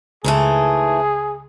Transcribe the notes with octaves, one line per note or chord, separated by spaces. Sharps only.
C#2 G#2 E3 A3 G#4